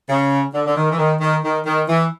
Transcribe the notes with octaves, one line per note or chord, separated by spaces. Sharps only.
C#3
D3
D3
D#3
E3
D#3
D#3
D#3
D#3
E3